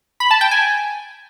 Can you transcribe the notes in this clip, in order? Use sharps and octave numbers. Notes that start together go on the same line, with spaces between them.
B5
A5
G5
G#5